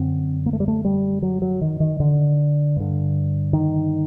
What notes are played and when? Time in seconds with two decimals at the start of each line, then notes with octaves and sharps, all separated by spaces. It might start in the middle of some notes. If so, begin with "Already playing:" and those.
Already playing: F#2 D3 C4
0.46 A#3
0.53 A3
0.60 G3
0.68 A3
0.85 G3
1.22 F#3
1.42 F#3
1.61 D#3
1.80 D#3
2.00 D3
2.76 G2 D3
3.53 D#3